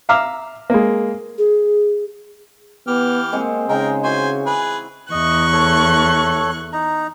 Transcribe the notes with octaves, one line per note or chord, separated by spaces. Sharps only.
E5 F5 A#5 D6 E6 F6
G#3 A#3
G#4
E3 B3 G4 F6
G#3 A#3 C4 F#5
C#3 G#3 D#4 G#4 A#4 G5
E3 F#4 C5 G#5
G#4 B4
E2 D#5 C#6 F#6
A4 C#5
D#4 A#5